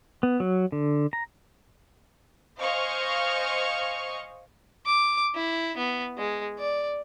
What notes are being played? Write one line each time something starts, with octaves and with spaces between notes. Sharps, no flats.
B3
F#3
D3
A#5
C5 D#5 F5 G#5 C#6 F6
D6
E4
B3
G#3
D5